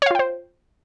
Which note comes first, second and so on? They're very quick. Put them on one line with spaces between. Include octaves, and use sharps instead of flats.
C#5 F5 F4 G5 C5